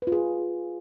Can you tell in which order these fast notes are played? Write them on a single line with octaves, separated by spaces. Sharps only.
B4 F4 G#4